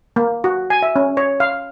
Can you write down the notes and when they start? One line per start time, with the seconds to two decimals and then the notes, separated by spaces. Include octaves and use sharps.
0.16 A#3
0.44 F#4
0.70 G#5
0.82 E5
0.96 C#4
1.17 C#5
1.40 F5